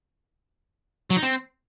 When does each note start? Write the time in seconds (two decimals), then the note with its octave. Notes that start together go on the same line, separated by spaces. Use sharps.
1.10 F#3
1.17 D#4
1.23 C4